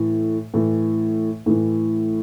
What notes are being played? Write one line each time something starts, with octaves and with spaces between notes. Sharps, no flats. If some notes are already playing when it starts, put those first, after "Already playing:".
Already playing: A2 E3
A2 E3
A2 E3